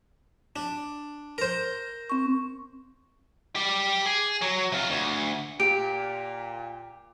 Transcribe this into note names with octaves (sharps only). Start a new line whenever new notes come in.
D4
A#4 C5
C4 C#6
G4 D5
G#4
F#3
C3 F4
D2
A#2 G4 D7